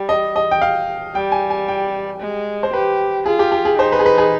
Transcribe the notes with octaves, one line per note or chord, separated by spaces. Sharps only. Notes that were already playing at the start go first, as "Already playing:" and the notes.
Already playing: G3
D#5
D#5
G5
F5
G3 G5
G#5
G#5
G5
G#3
C5
G4 B4
F4 G#4
G4
G4
G#4
D#4 C5
B4
G#4
B4
G#4